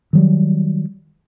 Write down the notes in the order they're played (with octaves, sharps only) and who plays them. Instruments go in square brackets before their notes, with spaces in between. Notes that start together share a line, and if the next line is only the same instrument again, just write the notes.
[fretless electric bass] D#3 F#3 G3